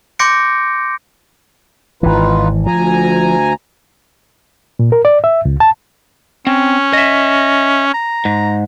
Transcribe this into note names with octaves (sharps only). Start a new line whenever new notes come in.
C6 D6 G6 A#6 C#7 D7
G#1 E3 D#4 F4 B4
D2 F3 G#5 A#5
A#2
A#4
D5
E5
C#2
A5
C4 C#4
D#5 E5
A#5
G#2